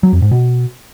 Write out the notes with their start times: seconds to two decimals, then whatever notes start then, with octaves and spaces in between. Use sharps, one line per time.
0.03 F#3
0.13 F2
0.22 G#2
0.31 B2